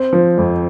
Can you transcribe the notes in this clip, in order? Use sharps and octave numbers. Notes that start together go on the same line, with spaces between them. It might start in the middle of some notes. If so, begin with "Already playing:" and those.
Already playing: C4
F3
F2